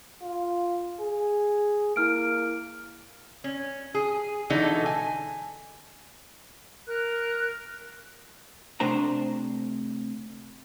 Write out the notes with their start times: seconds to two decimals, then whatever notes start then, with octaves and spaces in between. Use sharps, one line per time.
0.22 F4
1.00 G#4
1.96 A#3 E4 F6 D7
3.44 C#4
3.95 G#4
4.50 B2 D3 E3 G#3 D#4 A4
4.86 G#5
6.86 A#4 F#6
8.80 C3 A3 D4 C5 A#5